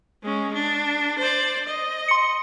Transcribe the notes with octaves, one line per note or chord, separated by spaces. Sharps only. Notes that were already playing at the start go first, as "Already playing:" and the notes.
G#3 C#4
D4
C5 D5
D#5
C6 C#7